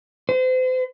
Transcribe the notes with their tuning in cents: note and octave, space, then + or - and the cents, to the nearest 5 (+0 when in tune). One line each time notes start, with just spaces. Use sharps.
C5 -35